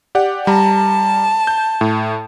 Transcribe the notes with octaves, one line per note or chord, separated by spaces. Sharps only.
G4 D5 F#5
G3 A5 A#5
G6
A2